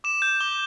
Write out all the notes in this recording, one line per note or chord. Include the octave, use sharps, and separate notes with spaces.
D6 E7
G6
D6 G7